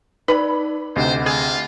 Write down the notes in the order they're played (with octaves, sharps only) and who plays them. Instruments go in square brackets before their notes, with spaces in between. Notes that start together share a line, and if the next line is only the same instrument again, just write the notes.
[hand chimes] D#4 D5 [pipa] B4 B5
[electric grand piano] D2 C3 [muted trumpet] C5 [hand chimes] D#5 F#5
[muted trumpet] F4 [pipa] G#4